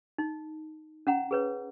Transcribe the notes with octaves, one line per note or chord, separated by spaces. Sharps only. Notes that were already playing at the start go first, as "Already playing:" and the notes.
D#4
C#4 F#5 A#5
G#4 B4 C#5